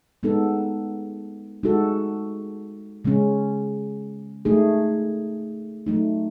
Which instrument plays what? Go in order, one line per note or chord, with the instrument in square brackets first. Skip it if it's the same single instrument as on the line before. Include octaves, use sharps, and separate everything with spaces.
[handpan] G#3 B3 D#4 A4
G#3 D#4 F#4 A4
C#3 G#3 C#4
A3 D#4 G#4
F#3 A3 D#4